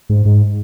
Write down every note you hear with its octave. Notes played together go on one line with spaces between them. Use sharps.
G#2
G#2